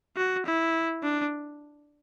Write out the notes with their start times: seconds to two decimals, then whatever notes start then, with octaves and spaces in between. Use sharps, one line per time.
0.17 F#4
0.46 E4
1.03 D4